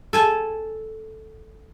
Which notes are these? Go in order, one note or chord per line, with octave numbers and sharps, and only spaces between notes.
A4 G#5 A5